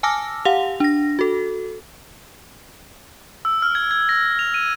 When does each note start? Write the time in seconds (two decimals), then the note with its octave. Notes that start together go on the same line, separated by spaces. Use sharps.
0.03 G#5 A5 D6 E6 F6 A#6
0.45 G4 F5 F#5 F7
0.80 D4 A#6
1.19 F#4 A4
3.45 E6
3.62 F6
3.75 G#6
3.91 G#6
4.09 A#6
4.39 F7
4.54 D#7